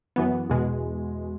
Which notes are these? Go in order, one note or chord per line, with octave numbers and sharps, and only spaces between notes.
F#2 E3 B3
E2 B2 G#3